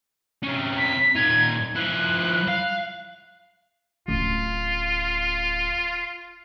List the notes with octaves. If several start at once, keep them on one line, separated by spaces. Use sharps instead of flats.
C3 C#4
B6
A#2 D#4 G#6
F3 E4 F#6
F5
D1 C#4 F4